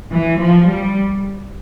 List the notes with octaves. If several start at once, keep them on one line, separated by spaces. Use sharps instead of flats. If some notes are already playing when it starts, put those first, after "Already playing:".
E3
F3
G3